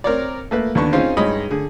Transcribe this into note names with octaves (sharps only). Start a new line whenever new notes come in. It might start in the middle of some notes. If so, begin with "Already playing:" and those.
C4 A#4 C#5 D5
A3 A#3 B4
D#2 D3 B3 D4 C#6
C4 C#4 D#4 F4 G#4 C5
G2 G#3 D#4 C#5 D#5 B5
D3 G#4